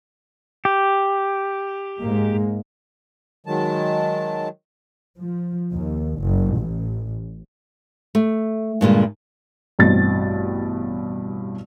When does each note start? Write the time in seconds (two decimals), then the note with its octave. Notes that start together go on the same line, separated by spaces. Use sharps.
0.65 G4
2.01 G#2 G#3 A#3
3.46 D#3 F#3 G#3 A5
5.18 F3
5.74 D#2
6.22 F#1
6.57 A1
8.15 A3
8.81 G2 A#2 D3 G#3
9.79 A1 G2 B2 C4 A6